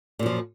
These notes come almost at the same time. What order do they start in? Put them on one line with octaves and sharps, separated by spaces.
A#2 F#2 F3